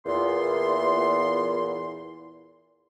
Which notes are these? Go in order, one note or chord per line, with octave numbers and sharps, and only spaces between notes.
E2 A#2 C6